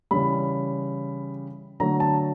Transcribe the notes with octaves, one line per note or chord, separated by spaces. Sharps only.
C#3 E3 G3 B5
D3 F#3 A3 A#5
A5